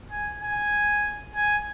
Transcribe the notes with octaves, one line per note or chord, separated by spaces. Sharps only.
G#5
G#5
G#5